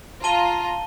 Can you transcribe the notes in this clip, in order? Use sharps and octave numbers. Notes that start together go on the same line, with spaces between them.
F4 A5 A#5 D#7 G7